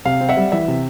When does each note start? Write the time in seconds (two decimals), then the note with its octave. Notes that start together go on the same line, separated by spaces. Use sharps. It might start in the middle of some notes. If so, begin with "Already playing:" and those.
0.05 C3 F5
0.21 C4
0.29 E5 F#5
0.37 G3
0.52 E3 E5
0.68 C3